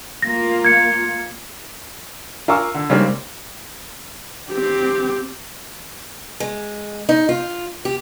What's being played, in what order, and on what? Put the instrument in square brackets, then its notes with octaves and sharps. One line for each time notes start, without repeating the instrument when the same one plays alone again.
[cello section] A#3 F4 [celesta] A#6
[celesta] G#6 C#7
[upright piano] F4 A#4 G#5 C#6 D6 E6
D3
C#3 G3 G#3 A#3 C4 D#4
[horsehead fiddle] C4 G4
[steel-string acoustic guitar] G#3
D#4
F4
G4